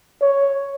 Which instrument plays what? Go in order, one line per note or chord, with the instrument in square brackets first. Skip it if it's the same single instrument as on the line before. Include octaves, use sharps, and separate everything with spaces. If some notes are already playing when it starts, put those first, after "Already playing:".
[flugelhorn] C#5